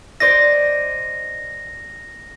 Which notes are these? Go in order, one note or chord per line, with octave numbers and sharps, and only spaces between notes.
C5 D5 D#5 A#6